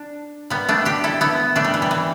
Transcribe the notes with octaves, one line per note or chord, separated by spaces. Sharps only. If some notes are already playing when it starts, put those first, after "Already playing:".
Already playing: D4
G3 B3
A3 D4
D4 G4
E4 A4
B3 E4
A3 D4
G3
E3
G3
E3